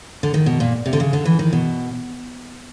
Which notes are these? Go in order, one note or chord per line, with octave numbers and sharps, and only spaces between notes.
D3
D#3
B2
A#2
C3
D3
C#3
D3
E3
D#3
B2